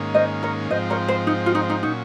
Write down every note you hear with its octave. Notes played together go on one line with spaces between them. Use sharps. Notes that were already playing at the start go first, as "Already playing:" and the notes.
Already playing: G#2 D#3 A#3 C#4
C5 D#5
A#4 C#5
G#2 F3 C4 C5 D#5
A#4 C#5
C5
D#4
F4
D#4
D#4
A#2 F#3 C#4 D#4